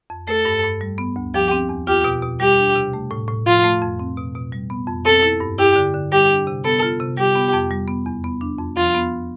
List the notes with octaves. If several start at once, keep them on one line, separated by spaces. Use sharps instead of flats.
F2
A3 A4
G2
G2
G3
B3
D2
F3 G4
C4
E2
F4 G4
B2
B2
G3 G4
D4
C3
A3
A2
A2
F3 F4
A3
F2
C4
B2
B2
G3
B3
F2
C4 A4
E4
G2
E4 G4
D3
D3
G3 G4
D4
C3
B3 A4
F4
C3
G3 G4
B3
F2
G3
B3
E2
B3
D4
F2
F3 F4
B3